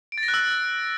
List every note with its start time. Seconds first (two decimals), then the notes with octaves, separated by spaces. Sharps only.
0.12 D7
0.18 A6
0.23 A#6
0.28 F#6
0.34 E6